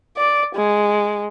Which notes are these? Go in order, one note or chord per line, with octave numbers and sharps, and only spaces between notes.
D5
G#3